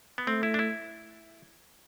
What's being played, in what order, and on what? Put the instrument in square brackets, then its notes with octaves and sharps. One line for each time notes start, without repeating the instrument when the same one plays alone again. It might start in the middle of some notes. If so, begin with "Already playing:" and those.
[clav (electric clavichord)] B3
[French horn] A3 [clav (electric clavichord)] C4
[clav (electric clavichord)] E4
D4
E4